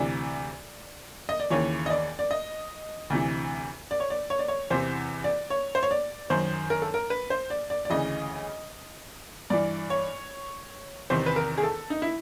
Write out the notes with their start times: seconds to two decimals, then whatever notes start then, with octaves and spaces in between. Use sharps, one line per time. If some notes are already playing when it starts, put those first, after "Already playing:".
Already playing: D2 C3 E3 D5
1.29 D#5
1.40 D5
1.50 D#2 C#3 E3 C#5
1.86 D#5
1.90 D5
2.19 D5
2.31 D#5
3.10 D2 C3 E3
3.91 D5
4.00 C#5
4.10 D5
4.30 C#5
4.39 D5
4.48 C#5
4.70 E2 C3 E3 C5
5.24 D5
5.50 C#5
5.75 C5
5.83 C#5
5.91 D5
6.30 F#2 D#3 C5
6.70 A#4
6.82 A4
6.94 A#4
7.10 B4
7.30 C5
7.50 D5
7.70 D5
7.85 D5
7.90 D2 C#3 E3 D#5
9.50 G2 E3 D5
9.90 C#5
11.10 E2 C3 D#3 C5
11.26 B4
11.36 A#4
11.58 G#4
11.63 A4
11.90 D#4
12.02 E4